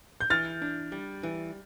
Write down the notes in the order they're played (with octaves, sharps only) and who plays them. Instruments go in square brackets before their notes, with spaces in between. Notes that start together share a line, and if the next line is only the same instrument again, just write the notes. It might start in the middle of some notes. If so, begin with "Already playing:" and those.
[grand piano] G6
[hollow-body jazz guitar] E3 [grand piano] F6 A6
[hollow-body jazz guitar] D4
G3
E3